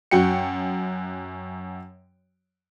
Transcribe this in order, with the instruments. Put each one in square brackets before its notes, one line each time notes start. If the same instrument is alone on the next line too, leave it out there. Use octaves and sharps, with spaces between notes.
[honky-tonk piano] F#2 F#4 G5 C#7